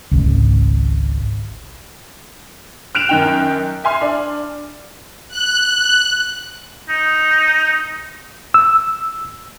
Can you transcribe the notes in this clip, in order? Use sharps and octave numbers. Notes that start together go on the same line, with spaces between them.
G#1 C#2
F6 F#6 D7 E7 F7
F#2 D#3 G5
E5 G#5 C6 F6
D4
F#6
D#4
E6